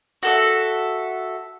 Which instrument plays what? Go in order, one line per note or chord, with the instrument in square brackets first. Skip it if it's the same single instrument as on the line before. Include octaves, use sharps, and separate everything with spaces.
[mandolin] F#4 A4 E5